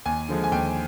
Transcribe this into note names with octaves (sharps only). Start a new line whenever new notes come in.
D#2 G#5
D3 F3 G#3
G#5
D#2 G5